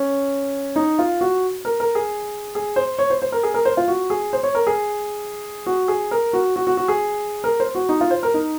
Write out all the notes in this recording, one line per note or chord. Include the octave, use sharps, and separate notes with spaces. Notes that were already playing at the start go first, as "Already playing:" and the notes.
Already playing: C#4
D#4
F4
F#4
A#4
A#4
G#4
G#4
C5
C#5
C5
C5
A#4
G#4
A#4
C5
F4
F#4
G#4
C5
C#5
A#4
G#4
F#4
G#4
A#4
F#4
F#4
F#4
F#4
G#4
A#4
C5
F#4
D#4
F4
C5
A#4
D#4